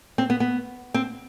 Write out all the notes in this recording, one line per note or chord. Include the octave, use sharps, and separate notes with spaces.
C4
B3
B3
C4